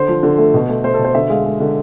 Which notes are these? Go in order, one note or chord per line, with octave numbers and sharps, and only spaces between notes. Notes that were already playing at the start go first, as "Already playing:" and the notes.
Already playing: D3 C5
F3
D3
A3
B2
A3
A3 C5
A4
B2
C5
D3 E5
G#3 F5
G#3
D3